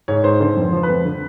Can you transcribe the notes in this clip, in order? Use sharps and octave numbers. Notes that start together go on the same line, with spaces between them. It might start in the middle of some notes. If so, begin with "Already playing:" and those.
G#2 C#5
G#2 C5
D3 C5
F2
C5
F3 C5
B4
F2
D3